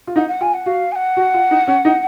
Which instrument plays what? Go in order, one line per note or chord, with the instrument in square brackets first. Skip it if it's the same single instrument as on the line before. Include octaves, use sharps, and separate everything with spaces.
[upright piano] F4
[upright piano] D#4 [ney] F#5
[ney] F#5
[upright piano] F4 [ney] G#5
[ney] F#5
[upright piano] F#4 [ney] F5
[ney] G#5
F#5
[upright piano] F#4
F4
D#4
C#4
D#4